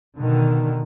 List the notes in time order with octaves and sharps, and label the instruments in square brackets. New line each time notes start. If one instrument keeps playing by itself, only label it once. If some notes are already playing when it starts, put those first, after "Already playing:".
[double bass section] B2 D3 D#3